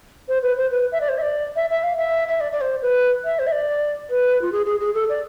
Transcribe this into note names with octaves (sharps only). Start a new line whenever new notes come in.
C5
B4
C5
B4
E5
D5
C5
E5
D5
E5
E5
F5
E5
E5
D5
D5
C5
B4
E5
C5
E5
D5
B4
F4
G#4
G#4
G#4
A4
D5